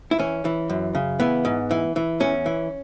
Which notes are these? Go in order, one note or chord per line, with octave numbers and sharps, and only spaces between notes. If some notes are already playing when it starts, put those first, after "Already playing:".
E4
E3 C#4
E3
F#2
C#3
E3 B3
G#2
E3
E3
E2 C#4
E3